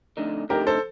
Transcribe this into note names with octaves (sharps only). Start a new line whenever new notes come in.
F2 D3 A3 D#4
F2 D3 A3 D#4 G4 A#4
A4 C5